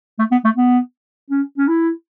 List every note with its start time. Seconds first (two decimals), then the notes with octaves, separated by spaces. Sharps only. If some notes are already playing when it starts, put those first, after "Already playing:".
0.19 A3
0.32 B3
0.44 A3
0.56 B3
1.30 C#4
1.58 C#4
1.68 E4